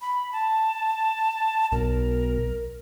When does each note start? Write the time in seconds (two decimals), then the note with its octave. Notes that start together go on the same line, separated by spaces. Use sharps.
0.01 B5
0.32 A5
1.72 B1 A#4